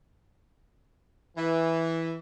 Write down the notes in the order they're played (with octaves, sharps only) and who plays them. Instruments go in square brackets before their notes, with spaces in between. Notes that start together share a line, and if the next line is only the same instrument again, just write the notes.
[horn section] E3